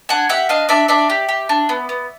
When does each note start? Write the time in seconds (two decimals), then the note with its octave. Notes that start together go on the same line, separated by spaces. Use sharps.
0.09 D4 F#5 G#5
0.29 G4 E5 F#5
0.49 D4 D#5 F5
0.69 D4 D5 E5
0.88 D4 D5 E5
1.10 G4
1.29 G4
1.49 D4
1.69 B3
1.89 B3